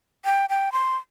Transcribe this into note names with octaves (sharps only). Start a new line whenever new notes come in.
G5
G5
C6